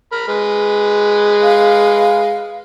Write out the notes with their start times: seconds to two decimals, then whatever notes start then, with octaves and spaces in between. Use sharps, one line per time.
0.12 A#4 B5
0.28 G#3 B4
1.42 F5